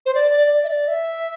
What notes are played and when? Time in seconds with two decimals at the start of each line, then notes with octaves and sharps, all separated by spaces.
0.06 C5
0.15 D5
0.31 D5
0.47 D5
0.64 E5
0.67 D5
0.88 E5